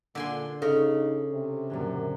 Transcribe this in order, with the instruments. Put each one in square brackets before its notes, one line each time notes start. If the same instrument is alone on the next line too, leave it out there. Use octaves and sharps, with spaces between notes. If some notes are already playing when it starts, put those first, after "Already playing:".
[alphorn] A#2 [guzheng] D3 G#5 C6 [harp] D4
[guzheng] C#3 [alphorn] D#4 [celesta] A4
[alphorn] C3
[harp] F#2 A#2 D3